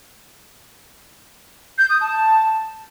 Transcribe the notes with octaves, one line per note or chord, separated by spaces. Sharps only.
G6
D#6
A5